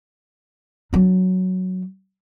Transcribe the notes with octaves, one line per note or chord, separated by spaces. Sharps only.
F#3 D4